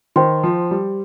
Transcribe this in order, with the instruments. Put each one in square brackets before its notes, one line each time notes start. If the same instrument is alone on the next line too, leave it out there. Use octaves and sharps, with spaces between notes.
[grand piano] D#3 [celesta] C5 G5 C6
[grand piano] F3
G3